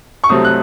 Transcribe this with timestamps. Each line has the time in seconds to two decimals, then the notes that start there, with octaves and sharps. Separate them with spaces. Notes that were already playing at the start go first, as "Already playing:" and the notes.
0.24 C#6
0.29 C2 C3 F#3 A3 C4 D#6
0.45 F#6